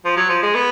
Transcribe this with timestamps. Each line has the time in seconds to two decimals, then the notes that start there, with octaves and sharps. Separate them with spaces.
0.05 F3
0.17 F#3
0.29 F3
0.43 G#3
0.55 B3